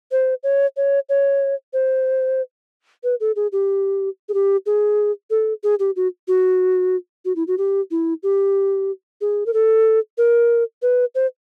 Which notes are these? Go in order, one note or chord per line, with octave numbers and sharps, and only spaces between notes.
C5
C#5
C#5
C#5
C5
B4
A4
G#4
G4
G#4
G4
G#4
A4
G#4
G4
F#4
F#4
F#4
E4
F#4
G4
E4
G4
G#4
A#4
A4
A#4
B4
C5